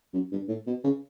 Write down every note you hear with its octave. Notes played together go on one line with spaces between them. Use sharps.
F#2
G2
A2
B2
C#3